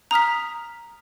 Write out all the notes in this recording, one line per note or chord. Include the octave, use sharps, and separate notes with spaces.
A#5 D#6 F6 B6